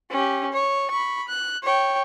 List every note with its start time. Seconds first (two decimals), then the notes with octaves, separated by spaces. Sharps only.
0.11 C#4 G4
0.52 C#5
0.91 B5 C#6
1.28 F#6
1.63 C#5 G5